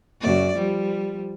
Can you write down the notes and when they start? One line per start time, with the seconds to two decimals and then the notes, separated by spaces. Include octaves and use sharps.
0.21 F#2 C#3 D5
0.54 F3 G3